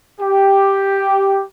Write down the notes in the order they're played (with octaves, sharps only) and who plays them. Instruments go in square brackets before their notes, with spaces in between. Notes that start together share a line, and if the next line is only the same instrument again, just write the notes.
[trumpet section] G4